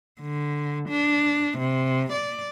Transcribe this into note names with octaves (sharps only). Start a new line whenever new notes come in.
D3
D4
C3
D5